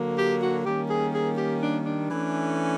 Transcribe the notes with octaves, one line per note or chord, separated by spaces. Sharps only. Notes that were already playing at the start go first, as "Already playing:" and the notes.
Already playing: D3 F#3 A#3
G4
F#4
D#3 G3 A#3 C#4 G4
G#4
G#4
G4
D4
D4
E3 A3 C#4